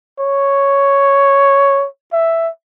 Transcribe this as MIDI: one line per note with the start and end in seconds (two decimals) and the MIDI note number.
0.20 1.86 73
2.13 2.49 76